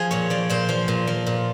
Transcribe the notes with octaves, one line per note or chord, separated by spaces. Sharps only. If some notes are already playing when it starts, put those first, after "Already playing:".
Already playing: F3 G#4
A#2 C#5
F3 D5
A#2 C5
F3
A#2
F3
A#2